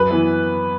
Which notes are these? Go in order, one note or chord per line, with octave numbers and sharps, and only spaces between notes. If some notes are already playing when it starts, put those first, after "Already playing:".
Already playing: F#2 B4
E3 B3 E4